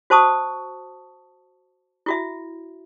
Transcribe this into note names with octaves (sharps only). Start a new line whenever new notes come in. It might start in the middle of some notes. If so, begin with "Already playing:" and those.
F#4 C5 A5 C#6 D#6
E4 F#4 E5